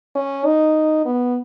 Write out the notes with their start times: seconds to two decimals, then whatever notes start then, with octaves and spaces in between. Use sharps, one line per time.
0.15 C#4
0.45 D#4
1.05 B3